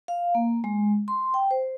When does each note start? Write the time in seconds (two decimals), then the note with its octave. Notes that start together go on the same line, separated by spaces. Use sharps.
0.08 F5
0.35 A#3
0.64 G#3
1.08 C6
1.34 G5
1.51 C5